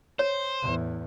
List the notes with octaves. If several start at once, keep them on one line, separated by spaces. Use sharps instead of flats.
C5 C#5
E2 A2